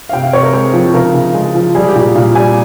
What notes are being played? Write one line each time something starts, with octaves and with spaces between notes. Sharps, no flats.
F5
C3 G5
F5
C3 C#5
A#4
G#3 C5
F3
C#3 A#4
C#3
G#3
F3
G3 G#4
G4
A#2
G4
A#2 F5
G3 G#5